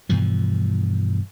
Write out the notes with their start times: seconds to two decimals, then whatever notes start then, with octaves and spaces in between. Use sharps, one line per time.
0.09 G2 B2 E3 F3